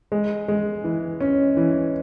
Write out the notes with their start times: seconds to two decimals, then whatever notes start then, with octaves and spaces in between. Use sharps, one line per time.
0.12 G#3
0.48 G#3
0.84 E3
1.20 C#4
1.57 E3